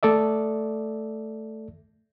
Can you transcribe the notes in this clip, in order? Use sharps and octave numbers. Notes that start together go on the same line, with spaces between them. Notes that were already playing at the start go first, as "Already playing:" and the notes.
A3 A4 D5 E5